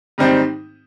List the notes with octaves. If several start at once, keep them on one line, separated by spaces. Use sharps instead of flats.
G#2 D#3 G3 C4 D#4